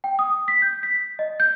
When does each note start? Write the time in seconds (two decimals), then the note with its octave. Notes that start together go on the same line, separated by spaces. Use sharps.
0.04 G5
0.19 D#6
0.48 B6
0.62 G6
0.83 B6
1.19 D#5
1.40 G6